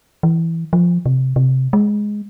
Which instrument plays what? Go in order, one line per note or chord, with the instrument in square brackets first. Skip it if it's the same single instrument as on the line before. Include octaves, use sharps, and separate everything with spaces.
[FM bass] E3
F3
C3
C3
G#3